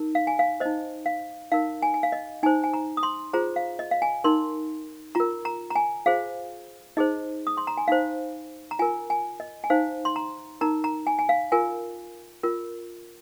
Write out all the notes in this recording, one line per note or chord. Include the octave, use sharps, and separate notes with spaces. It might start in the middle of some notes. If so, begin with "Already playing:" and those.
Already playing: D#4 A#4
F5
G#5
F5
D#4 C5 D#5
F5
D#4 A#4 F5
G#5
G#5
F5
D#5
D#4 C5 G#5
G#5
A#5
D#6
C6
F4 G#4 C5 A#5
F5
D#5
F5
G#5
D#4 A#4 C6
F4 A#4 A#5
A#5
A#5
G#5
F4 G#4 C5 F5
D#4 G#4 C5 D#5
D#6
C6
A#5
G#5
D#4 C5 F5
A#5
F4 A#4 G#5
G#5
D#5
G#5
D#4 C5 F5
C6
A#5
D#4 A#4 A#5
A#5
G#5
G#5
F5
F4 A#4 G#5
F4 A#4